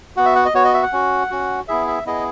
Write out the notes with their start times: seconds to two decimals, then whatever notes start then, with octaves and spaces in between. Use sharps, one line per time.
0.16 B3 F#4 F#5
0.26 E5
0.36 F#5
0.45 D#5
0.54 B3 F#4 C#5
0.64 D#5
0.74 E5
0.83 F#5
0.92 C#4 F#4
1.31 C#4 F#4
1.68 B3 E4 G#4 E5
1.87 E5
2.06 B3 E4 G#4 D#5